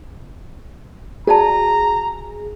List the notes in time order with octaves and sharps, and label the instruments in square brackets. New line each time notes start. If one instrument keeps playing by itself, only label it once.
[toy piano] F#4 D5 A5 [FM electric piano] G#4 [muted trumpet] A#5